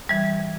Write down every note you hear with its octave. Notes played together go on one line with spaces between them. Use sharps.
E3 G3